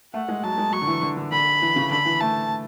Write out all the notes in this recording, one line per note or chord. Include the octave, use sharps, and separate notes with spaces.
A3 F#5
G#3
F#3 A5
G#3
F#3 C#6
D3
E3
D3
D3
D3 B5
E3
C#3
D3 B5
E3
A3 A5